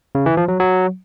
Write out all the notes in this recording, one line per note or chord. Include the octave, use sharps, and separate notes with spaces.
C#3
E3
F3
F#3
F#3